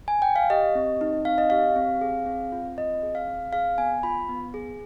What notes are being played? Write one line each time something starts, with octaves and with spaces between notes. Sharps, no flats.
G#5
G5
F5
G4 D#5
C4
D#4
C4 F5
D#5
G4 F5
C4
G#4
C4
F4
C4 D#5
G#4
F5
C4
G#4 F5
B3 G#5
F4 B5
B3
G#4